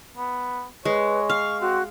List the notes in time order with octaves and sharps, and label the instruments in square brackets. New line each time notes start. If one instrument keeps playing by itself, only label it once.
[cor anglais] B3
[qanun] G#3 [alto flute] B4 [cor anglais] C#5
[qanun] F5 [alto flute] C#6
[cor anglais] C4 [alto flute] F#4